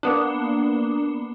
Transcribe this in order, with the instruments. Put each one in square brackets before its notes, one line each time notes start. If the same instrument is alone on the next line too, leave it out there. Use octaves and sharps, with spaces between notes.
[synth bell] A#3 B3 D4